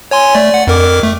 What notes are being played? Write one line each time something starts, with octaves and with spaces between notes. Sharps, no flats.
C#5 G#5 C6
A3 D5
D5 F#5
F2 A#4 D6
A3